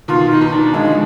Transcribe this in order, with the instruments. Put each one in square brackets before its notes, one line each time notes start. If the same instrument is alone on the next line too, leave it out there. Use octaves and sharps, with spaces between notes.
[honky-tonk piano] B2 D#3 [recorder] F4
[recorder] D#4
[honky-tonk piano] B2 D#3
[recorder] D4
[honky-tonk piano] D3 F3 [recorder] G#3